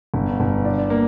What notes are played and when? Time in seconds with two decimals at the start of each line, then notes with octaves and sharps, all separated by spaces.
0.14 G1
0.40 G1
0.65 D4
0.90 A#3